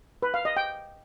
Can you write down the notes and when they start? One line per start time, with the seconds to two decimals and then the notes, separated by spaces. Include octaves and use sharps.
0.22 B4
0.34 F5
0.45 D#5
0.57 G5